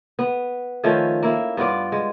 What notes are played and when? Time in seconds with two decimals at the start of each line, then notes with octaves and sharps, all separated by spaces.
0.19 B3
0.84 D#3 F3 A3 C#4
1.23 A#3 E4
1.57 G2 B3 F4 D5
1.92 G#3